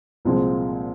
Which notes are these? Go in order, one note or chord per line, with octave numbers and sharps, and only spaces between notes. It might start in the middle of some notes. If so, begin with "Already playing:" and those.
C2 A#2 F3 G#3 C4